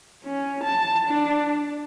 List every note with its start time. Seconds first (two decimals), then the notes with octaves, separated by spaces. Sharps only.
0.25 C#4
0.64 A5
1.06 D4